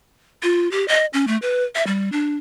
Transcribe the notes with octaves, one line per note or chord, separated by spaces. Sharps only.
F4
G4
D#5
C#4
A3
B4
E5
G3
D4